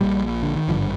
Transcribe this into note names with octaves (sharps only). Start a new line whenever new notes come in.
A#1 A#2 G3
D3
D#3
G#1 G2 D3 F3